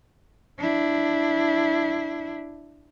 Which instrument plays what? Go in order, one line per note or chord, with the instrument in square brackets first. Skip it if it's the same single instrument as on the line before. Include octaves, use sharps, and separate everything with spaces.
[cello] D4 E4